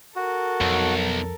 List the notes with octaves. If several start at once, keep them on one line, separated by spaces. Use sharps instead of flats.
F#4 A4 A#4
B1 F2